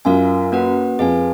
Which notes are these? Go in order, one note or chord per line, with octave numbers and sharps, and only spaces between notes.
F#2 F4 A#4 F5 G#5
A#3 C#4 F#4 B4 F#5
F2 G#4 B4 F5 G#5